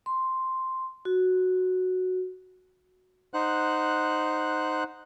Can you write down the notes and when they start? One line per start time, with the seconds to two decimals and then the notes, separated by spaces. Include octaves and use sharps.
0.06 C6
1.05 F#4
3.34 D#4 C5 F#5 F#6